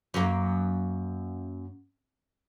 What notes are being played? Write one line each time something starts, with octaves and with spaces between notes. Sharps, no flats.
F#2 A#3